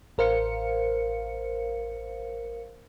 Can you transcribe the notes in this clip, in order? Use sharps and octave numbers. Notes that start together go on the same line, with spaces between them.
A1 A#4 C5 F5 C#7